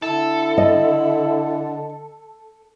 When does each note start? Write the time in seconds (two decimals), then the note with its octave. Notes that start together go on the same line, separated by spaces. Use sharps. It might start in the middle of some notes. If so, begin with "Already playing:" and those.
0.02 D3 E4 A4
0.58 D#5